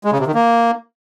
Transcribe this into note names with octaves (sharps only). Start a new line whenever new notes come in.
G#3
C#3
C3
D#3
A#3